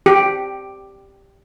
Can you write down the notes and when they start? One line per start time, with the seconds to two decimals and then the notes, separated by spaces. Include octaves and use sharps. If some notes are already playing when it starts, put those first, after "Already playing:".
0.06 G4